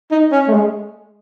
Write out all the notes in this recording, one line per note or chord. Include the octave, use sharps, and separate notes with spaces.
D#4
C#4
A3
G#3